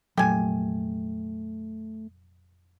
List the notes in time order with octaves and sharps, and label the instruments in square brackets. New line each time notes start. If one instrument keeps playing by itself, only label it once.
[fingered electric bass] F1 A#2 F#3 [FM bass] A3 [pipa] G4 G#5